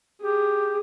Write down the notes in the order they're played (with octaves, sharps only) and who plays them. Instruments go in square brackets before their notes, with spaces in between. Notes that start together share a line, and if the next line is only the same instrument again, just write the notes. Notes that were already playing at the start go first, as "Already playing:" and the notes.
[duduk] G4 [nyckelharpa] G#4